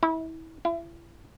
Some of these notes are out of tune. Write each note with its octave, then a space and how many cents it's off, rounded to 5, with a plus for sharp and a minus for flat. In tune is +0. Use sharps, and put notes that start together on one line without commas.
E4 -30
E4 +35